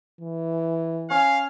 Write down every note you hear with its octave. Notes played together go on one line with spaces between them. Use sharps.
E3
C#4 F5